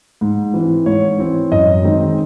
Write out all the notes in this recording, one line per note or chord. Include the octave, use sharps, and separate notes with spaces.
G#2
E3 C4
G#2 C#5
E3 C4
F#2 D#5
D#3 G#3 C4